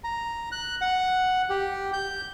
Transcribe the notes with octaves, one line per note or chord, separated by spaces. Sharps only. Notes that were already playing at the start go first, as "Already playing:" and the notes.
A#5
F#6
F#5
G4
G6